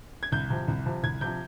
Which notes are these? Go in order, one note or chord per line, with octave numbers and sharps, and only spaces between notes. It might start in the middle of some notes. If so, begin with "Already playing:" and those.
G#6
C2 G6
C3 F3
C2
C3 F3
C2 G#6
C3 F3 G6